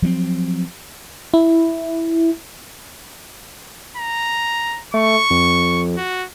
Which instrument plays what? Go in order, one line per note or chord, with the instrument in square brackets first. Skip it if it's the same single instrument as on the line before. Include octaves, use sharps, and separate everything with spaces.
[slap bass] F3 F#3 A#3 C4
[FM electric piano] E4
[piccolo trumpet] A#5
[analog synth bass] A3 [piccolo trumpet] C#6
[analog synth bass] F2
[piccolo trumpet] F#4